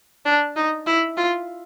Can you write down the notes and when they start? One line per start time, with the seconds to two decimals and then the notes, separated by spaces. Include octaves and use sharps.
0.25 D4
0.56 D#4
0.87 E4
1.17 F4